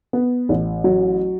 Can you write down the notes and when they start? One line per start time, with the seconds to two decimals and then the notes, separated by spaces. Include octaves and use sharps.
0.13 B3
0.49 A1
0.84 F#3